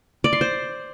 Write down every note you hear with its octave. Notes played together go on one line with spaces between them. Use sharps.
D5
C6
C5